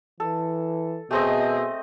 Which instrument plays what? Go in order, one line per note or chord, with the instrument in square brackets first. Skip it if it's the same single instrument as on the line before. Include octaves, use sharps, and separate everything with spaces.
[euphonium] E3 [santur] A4
[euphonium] B2 [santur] A3 C4 D#5 [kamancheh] G#4